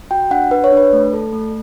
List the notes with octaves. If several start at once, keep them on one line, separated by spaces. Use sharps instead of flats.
F#4 G5
D4 F#5
D4 B4
C#5
D4
B4
A3
A4
A3